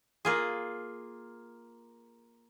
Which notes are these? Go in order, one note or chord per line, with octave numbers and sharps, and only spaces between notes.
A#3 F4 G#4